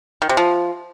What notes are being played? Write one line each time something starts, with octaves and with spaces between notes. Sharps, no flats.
D#3
C3
F3